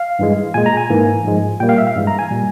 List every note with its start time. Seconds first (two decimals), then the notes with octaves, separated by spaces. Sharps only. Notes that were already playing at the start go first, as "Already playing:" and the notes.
Already playing: F5
0.19 G2 E3 G#3
0.54 A#2 G#3 G#5
0.66 A#5
0.77 G#5
0.90 G#2 E3 A#3
1.25 G#2 F3 G#3
1.60 A#2 G3 A#3 G5
1.69 F5
1.78 E5
1.87 F5
1.96 G2 E3 G#3
2.07 A#5
2.19 G#5
2.31 A#2 G3